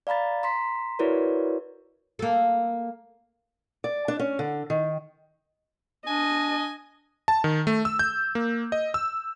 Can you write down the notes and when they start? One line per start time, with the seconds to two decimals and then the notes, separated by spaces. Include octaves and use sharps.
0.07 D5 F5 A#5 B5 A6
0.43 A#5 C6 B6
0.99 E4 F#4 A#4 B4 C#5 D5
2.19 A#3 A4
3.84 D5
4.08 D4
4.20 C#4
4.39 D3
4.70 D#3
6.07 D4 D#5 G#5
7.28 A5
7.44 D#3
7.67 A3
7.85 E6
7.99 G6
8.35 A#3
8.72 D#5
8.94 E6